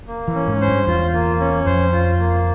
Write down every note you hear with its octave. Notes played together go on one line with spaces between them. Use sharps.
A#3
E3
C#4
G#2
C5
G2
E2 F4
A#3
C#4
F2 C5
F4
A#3